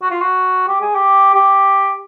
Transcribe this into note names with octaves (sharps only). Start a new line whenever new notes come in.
F#4
F4
F#4
G4
G#4
G4
G4